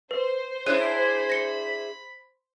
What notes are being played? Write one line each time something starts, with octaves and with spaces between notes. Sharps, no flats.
B4 C5
D4 E4 G#4 C#5 B5 F#6 D#7
A#6 C#7 G7